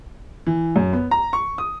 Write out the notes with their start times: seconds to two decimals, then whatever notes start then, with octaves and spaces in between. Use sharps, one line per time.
0.47 E3
0.76 F#2
0.93 B3
1.11 A#5
1.33 C#6
1.58 D#6